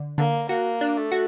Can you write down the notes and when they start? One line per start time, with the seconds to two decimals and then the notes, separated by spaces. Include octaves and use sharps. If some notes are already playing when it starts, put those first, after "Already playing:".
Already playing: D3
0.18 D3 A#3
0.49 A#3 F#4
0.81 D4
0.97 A3
1.12 F#4